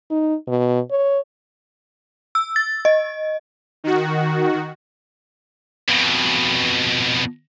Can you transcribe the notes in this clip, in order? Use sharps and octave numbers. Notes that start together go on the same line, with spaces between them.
D#4
B2
C#5
E6
A6
D#5
D#3 F#4
F2 B2